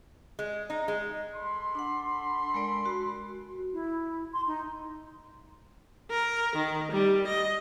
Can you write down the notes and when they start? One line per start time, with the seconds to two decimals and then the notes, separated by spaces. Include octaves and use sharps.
0.39 G#3
0.70 D#4
0.88 G#3
1.35 A4 B5 C6
1.75 D4 F#5
2.54 G#3 A#4 D5
2.86 F#4
3.73 E4
4.33 C6
4.47 D#4
6.10 A#4
6.56 D#3
6.92 G3
7.27 D#5